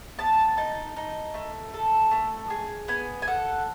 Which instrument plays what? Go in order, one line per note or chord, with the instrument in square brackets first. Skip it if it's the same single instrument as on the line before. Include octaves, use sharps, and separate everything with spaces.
[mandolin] B3 A5
D#4 A5
D#4
A3
A4
A3
G#4
B3 G#5
G#5
A4 F#5